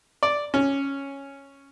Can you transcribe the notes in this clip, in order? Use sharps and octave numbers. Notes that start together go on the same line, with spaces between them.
D5
C#4